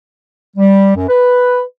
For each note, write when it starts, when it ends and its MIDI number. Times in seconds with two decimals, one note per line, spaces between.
0.57 0.96 55
0.96 1.06 42
1.08 1.61 71